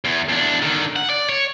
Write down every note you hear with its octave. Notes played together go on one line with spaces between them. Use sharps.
E2
E2 D4
D3 D#3
F#5
D5
C#5